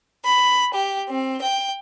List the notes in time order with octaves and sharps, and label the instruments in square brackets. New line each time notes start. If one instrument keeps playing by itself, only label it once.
[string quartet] B5
G4
C4
G5